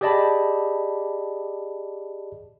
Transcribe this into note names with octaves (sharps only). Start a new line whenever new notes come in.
G4 G#4 D5 D#5 A5 B5